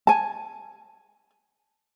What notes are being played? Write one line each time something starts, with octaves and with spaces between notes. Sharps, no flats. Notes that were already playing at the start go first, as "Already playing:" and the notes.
G#5 A5